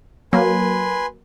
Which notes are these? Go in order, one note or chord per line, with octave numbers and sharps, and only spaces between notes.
F#3 A#3 B4 G#5 C6